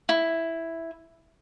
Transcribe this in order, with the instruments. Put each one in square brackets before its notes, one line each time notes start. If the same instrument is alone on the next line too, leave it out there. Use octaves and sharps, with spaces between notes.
[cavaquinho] E4